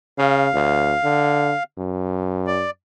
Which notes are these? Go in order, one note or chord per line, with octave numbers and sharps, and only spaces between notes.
C#3 F5
D2
D3
F#2
D5